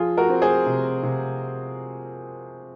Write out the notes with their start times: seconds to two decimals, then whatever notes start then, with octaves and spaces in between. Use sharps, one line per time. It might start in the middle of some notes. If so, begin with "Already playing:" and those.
Already playing: F3 F4 G#4
0.17 F#4 A#4
0.30 C4
0.42 G#4 C5
0.66 C3
1.03 C3